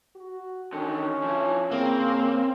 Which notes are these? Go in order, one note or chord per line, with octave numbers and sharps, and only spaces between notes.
F#4
D3 D#3 C#4
F3 E4
C#3 A#3 C4